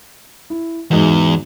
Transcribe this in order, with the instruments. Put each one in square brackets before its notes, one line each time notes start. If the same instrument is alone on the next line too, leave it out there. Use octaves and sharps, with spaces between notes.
[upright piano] E4
[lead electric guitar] E2 [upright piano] G#2 G#3 F#4